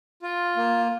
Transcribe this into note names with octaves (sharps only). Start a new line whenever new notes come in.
F4
A#3